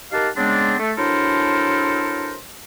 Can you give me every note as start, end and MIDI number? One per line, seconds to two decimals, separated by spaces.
0.12 0.28 63
0.12 0.28 67
0.12 0.28 70
0.12 0.28 77
0.12 0.28 78
0.12 0.28 81
0.37 0.75 49
0.37 0.75 56
0.37 0.75 59
0.37 0.75 60
0.37 0.75 62
0.79 0.92 57
0.97 2.35 54
0.97 2.35 62
0.97 2.35 64
0.97 2.35 69
0.97 2.35 70
0.97 2.35 72